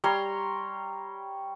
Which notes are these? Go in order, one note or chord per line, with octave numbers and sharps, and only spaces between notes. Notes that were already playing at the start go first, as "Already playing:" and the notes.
G3 C#5 A#5 C6